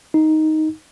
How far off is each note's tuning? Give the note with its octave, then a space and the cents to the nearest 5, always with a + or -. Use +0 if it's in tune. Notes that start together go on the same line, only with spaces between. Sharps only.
D#4 +5